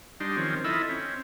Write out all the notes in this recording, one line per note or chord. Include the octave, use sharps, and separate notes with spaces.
G3 D4 D#4 C6
D#3 F3 C4 C#4
E4 F4 A4 D#5 E5 B5
C4 C#4